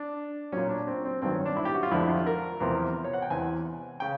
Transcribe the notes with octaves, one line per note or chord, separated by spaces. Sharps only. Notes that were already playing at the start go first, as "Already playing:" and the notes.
Already playing: D4
A#2 F#3 C#4
D4
C4
C4
G2 D#3 F#3 C4
C#4
D4
E4
G4
F#4
F4
F2 D3 F3 E4
F4
A#4
E2 C3 F3
C#5
F#5
G5
E2 C3 E3 G#5
C#3 G5